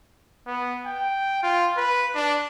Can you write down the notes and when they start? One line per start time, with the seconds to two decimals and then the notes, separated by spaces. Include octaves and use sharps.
0.47 B3
0.86 G5
1.43 F4
1.77 B4
2.15 D4